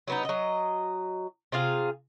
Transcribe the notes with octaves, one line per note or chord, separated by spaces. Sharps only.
F#3 B3 D#4
F#3 D#5
C3 F4 G#4 F5